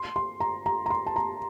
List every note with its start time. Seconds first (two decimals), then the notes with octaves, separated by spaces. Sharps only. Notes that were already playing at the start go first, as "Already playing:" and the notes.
Already playing: C6
0.16 C6
0.40 A#5
0.66 A#5
0.86 A#5
0.90 C6
1.06 A5
1.16 A#5